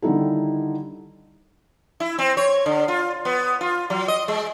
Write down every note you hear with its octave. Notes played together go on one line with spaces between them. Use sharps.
D3 D#3 G3 D#4 E4 A4
E4
C4
C#5
D3
F4
B3
F4
F#3
D#5
G#3